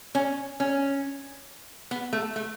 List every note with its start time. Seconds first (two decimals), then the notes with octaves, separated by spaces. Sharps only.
0.15 C#4
0.60 C#4
1.91 B3
2.13 A3
2.36 A3